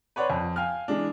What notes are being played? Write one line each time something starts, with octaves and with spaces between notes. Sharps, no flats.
B4 C#5 D5 F#5 C6
F2
F5 G5 G#5 F6
E3 G#3 D4